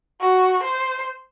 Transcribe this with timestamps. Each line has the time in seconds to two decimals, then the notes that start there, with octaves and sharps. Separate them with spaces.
0.21 F#4
0.63 C5